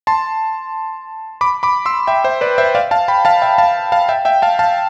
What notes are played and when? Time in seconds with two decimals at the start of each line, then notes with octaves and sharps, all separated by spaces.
0.07 A5 C6
1.41 B5 D6
1.63 B5 D6
1.86 C6 E6
2.07 E5 G5
2.24 C5 E5
2.41 B4 D5
2.58 C5 E5
2.75 D5 F5
2.91 F5 A5
3.08 G5 B5
3.25 F5 A5
3.42 E5 G5
3.58 F5 A5
3.92 F5 A5
4.09 E5 G5
4.25 E5 G5
4.42 F5 A5
4.59 F5 A5